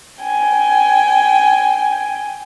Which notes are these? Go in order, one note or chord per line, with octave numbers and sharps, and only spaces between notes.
G5 G#5